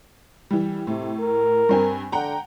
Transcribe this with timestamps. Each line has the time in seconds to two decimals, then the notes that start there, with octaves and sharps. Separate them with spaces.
0.51 E3 G3
0.87 A2 C3
1.19 A#4
1.69 G2 C4 G#5
2.12 D3 F#5 G5 A#5